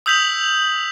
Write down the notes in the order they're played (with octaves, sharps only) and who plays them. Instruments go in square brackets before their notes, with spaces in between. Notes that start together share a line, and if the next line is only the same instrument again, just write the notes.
[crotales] D#6 E6 G6 B6 F7 F#7